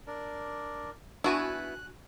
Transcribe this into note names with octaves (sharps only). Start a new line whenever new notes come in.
D4 A#4 D5
B3 D4 E4 F#4 G#5 F#6